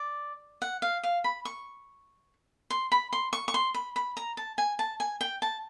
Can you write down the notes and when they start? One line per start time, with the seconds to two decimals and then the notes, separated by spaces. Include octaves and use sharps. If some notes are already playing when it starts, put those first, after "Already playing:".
Already playing: D5
0.62 F#5
0.82 F5
1.03 F5
1.24 B5
1.45 C#6
2.70 C6
2.92 B5
3.13 C6
3.33 C#6
3.48 C#6
3.54 C6
3.74 B5
3.96 B5
4.17 A#5
4.37 A5
4.58 G#5
4.79 A5
5.00 G#5
5.21 G5
5.42 A5